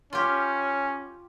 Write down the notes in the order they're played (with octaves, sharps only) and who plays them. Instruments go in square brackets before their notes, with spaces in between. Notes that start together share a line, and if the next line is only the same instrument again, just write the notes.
[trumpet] C#4 [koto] F4 G4